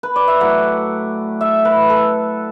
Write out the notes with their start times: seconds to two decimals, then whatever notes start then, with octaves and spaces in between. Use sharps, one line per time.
0.03 B4
0.16 D5
0.28 E5
0.40 A2 F#3 A3 F#5
1.41 E5
1.65 B4
1.90 A4